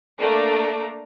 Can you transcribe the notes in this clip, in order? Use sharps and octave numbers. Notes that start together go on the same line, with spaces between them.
A3 A#3 D4 A#5 D6